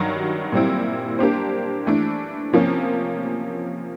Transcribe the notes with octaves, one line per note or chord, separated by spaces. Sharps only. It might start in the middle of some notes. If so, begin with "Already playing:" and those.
Already playing: G2 D#3 F#3
A#2 G3 C4 E4
A#3 D4 G4 C5
E3 A3 D4
C3 F3 A#3 C#4